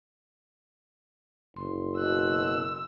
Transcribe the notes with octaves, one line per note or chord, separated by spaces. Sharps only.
F#1 C6
B2 E6 F#6